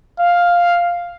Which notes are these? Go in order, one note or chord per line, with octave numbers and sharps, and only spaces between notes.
F5